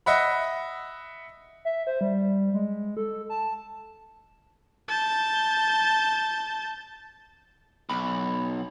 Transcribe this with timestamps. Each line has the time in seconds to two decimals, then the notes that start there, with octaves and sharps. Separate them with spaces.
0.06 D#5 E5 F#5 B5
1.65 E5
1.87 C5
2.01 G3
2.54 G#3
2.97 A4
3.29 A5
4.88 A5 G6
7.89 B1 B5